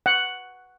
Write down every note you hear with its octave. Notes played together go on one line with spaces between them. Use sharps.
F#5